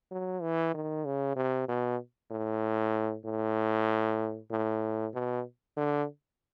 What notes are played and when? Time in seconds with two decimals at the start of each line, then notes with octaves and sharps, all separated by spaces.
0.11 F#3
0.42 E3
0.74 D#3
1.05 C#3
1.36 C3
1.69 B2
2.31 A2
3.25 A2
4.51 A2
5.14 B2
5.77 D3